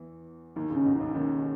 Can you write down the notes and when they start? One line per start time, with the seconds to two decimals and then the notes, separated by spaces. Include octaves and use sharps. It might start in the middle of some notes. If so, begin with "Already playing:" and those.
Already playing: E2 E3
0.56 D#2 D#3 D#4
0.70 C#2 C#3
0.76 C#4
0.85 B1 B2
0.95 C#2 C#3 D#4
1.15 D#2 D#3 C#4